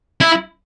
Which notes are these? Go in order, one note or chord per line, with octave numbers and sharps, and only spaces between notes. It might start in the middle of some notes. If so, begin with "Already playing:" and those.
E4